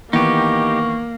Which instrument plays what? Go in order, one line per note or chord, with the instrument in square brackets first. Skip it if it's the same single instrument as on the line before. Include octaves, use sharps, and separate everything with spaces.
[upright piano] D#3 E3 B3 [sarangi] A#3 [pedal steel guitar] D#4 G4 [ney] C#6